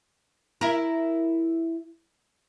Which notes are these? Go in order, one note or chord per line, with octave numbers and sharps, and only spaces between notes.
E4 A#4